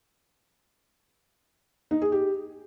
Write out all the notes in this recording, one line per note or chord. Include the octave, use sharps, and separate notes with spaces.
D#4
G#4
G4